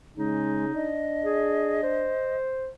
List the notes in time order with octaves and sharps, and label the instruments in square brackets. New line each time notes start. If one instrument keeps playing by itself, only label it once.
[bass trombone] C#3 [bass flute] G#3 [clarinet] D#4
[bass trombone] D4 [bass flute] D#5
[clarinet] G#4
C5